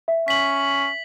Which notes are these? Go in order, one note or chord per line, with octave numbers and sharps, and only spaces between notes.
E5
C#4 B6 F#7